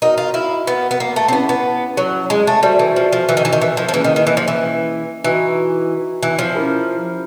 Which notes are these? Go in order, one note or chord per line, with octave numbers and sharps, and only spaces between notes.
D#4 F#4 A#4 D#5 F#5
F4
E4
B3
B3
A#3
A3
C4
B3 C#4 E4 G4
B3
F#3
G#3
A3
G3 F#4 A4 C5 E5 G#5
E3
F3
F3
E3
D#3
E3
D#3
E3
F3
F3
E3 A#3 C#4 E4 G#4 B4
D#3
D#3
E3
F3
E3
E3 D#4 F#4 B4 D#5 G#5
E3
F3
C#4 E4 G4 A#4